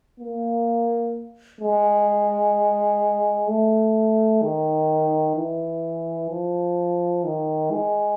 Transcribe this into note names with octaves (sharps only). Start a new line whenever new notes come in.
A#3
G#3
A3
D#3
E3
F3
D#3
G#3